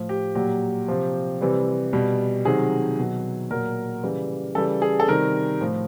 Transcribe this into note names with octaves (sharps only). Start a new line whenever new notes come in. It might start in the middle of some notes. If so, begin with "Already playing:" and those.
Already playing: A2 F3
G4
A#2 F#3 G4
C3 F3
C3 E3 G3
B2 G3
C3 D#3 F#3 G#4
B2 F#3
A#2 F#3 A#4
C#3 E3 G3
C#3 E3 G3 A4
G#4
A4
C3 D#3 G3 A#4
A2 F3